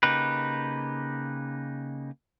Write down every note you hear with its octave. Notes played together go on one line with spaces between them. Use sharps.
C#3 A#3 D#4 G4 B4